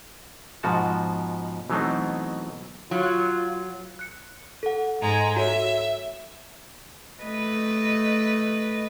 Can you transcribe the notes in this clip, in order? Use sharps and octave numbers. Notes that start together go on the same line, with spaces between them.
G#2 B2 F3 F#4 A5
B2 E3 F#3 A3 C4 D#4
F#3 F4
F#6 C#7
A4 F#5
G#2 G#3 A#5
F#4 A4 C#5 E5
A3 B4 D#5